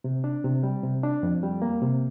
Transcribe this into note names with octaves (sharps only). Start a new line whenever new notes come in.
C3
D4
C3
G3
C3
D4
F2
G3
A#3
C3